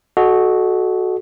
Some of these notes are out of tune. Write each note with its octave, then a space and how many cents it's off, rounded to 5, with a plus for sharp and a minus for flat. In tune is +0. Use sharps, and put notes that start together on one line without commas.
F#4 +0 A4 -30 D#5 -15